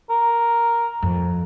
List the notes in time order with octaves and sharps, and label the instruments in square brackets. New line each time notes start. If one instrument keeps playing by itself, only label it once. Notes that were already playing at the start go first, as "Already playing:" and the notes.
[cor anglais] A#4
[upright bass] F2